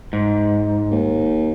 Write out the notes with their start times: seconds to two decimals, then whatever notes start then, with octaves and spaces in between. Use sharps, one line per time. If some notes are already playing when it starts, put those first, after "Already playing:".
0.13 G#2
0.91 D#2